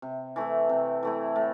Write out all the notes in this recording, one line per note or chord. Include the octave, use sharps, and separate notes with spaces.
C3
E3 A3 E4
C3
E3 A3 E4
A2